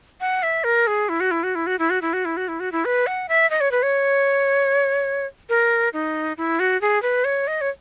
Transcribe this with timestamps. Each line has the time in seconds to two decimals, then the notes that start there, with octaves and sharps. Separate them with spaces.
0.20 F#5
0.43 E5
0.64 A#4
0.87 G#4
1.09 E4
1.20 F#4
1.31 E4
1.43 F#4
1.55 E4
1.67 F#4
1.79 E4
1.90 F#4
2.01 E4
2.13 F#4
2.25 E4
2.37 F#4
2.48 E4
2.60 F#4
2.72 E4
2.85 B4
3.07 F#5
3.28 E5
3.50 D#5
3.60 C#5
3.71 B4
3.83 C#5
5.49 A#4
5.93 D#4
6.37 E4
6.59 F#4
6.81 G#4
7.02 B4
7.24 C#5
7.47 D#5
7.61 C#5